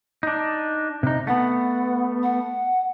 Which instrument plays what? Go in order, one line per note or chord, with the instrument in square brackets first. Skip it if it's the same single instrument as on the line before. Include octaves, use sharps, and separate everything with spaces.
[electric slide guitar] D4 D#4
C3 D#4
[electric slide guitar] A3 B3 [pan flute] F#5
[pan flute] F#5